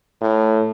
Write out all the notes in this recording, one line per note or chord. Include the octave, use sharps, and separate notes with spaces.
A2